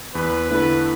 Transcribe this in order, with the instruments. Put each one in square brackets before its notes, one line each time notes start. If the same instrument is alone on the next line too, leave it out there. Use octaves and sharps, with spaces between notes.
[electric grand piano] E2 [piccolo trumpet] B4
[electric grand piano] D3 A3 E4 A4 [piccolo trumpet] B4